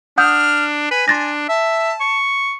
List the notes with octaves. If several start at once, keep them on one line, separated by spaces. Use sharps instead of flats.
D4 F#5 D#6 F6 G6
B4 G#5
D4 C6 A6 A#6
E5 A5
C#6